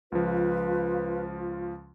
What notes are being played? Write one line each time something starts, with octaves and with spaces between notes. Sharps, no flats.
C#2 F3 F4 B4